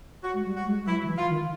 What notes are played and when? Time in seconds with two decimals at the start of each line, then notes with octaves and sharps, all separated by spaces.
0.23 F#4
0.34 G#3
0.45 G3
0.56 F#4
0.66 G#3
0.87 F#3 E4
1.03 D#3
1.07 E3
1.18 F4
1.29 D#3